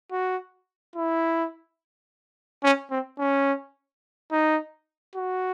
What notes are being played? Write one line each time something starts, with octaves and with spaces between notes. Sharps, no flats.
F#4
E4
C#4
C4
C#4
D#4
F#4